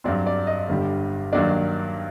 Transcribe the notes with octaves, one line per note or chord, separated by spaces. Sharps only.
G2 F#3 C4 D5
D5
D#5
G1 G2 D3 G3
G2 D#3 F#3 A#3 D4 D5